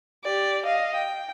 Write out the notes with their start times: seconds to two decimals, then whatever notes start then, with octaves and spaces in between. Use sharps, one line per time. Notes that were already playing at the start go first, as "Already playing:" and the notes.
0.24 G4 D5
0.65 D#5 F5
0.95 G5